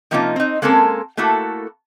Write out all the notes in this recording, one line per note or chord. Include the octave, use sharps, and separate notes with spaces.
C3 F3 A#3 C#4 D#4 F4
C4 D#4
G#3 A#3 C4 C#4 A4 A#4
A3 A#3 E4 F#4 A4